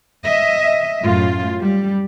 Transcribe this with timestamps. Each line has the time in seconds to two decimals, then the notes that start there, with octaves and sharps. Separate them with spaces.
0.23 D#5 E5
1.03 F#2 A2 F4
1.59 G3